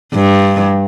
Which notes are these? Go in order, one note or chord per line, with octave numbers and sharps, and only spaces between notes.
G2